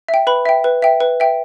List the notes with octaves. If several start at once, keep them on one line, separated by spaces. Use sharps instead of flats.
E5
G5
B4 B5
E5 G5
B4
E5 G5
B4
E5 G5